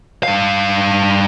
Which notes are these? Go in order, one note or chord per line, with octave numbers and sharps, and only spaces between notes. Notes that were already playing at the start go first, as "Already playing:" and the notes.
G2 F5